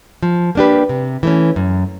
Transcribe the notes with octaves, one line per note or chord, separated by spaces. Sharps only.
F3
A#3 D4 G4 B4
C3
E3 A3 C#4
F#2